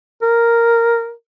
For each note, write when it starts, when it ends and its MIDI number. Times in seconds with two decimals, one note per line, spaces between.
0.22 1.12 70